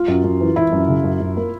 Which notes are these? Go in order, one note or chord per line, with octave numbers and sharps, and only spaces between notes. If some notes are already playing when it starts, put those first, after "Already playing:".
Already playing: F4
F#2
F#2
E3
E3 E4
F#2
C#3
F#2
F#2
A#3